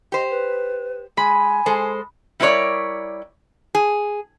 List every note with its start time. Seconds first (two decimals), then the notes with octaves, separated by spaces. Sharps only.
0.12 G4 C5 D#5
0.30 B4
1.17 G#3 G#5 B5
1.66 G#3 A4 C5
2.40 G3 E4 A#4 B4 C#5 D5
3.75 G#4